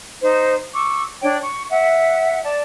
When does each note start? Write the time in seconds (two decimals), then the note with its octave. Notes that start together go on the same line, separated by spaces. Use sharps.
0.21 D#4 C5
0.74 C#6 D6 E6
1.22 D4 C#5 G5
1.41 C#6
1.71 E5 F#5
2.44 D5 A5